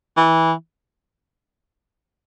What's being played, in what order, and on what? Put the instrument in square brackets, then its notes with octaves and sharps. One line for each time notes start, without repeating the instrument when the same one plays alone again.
[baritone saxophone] E3